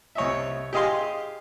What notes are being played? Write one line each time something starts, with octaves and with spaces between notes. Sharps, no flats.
C2 C#5 D#5 E5
G4 G#4 D#5 F5 C6